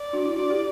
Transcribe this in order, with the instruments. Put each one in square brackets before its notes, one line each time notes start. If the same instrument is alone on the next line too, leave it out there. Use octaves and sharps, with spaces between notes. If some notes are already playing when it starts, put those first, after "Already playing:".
Already playing: [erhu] D5
[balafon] D4 F#4
E4
[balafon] D4 F#4 [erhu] D5
[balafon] E4 G4